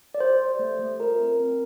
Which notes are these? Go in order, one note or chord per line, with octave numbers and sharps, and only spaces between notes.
D5
G4 C5
G4
A3
A3
F4 A#4
C4
C4